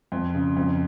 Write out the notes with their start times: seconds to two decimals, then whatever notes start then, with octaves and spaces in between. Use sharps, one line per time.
0.12 F2
0.34 C#3
0.57 F2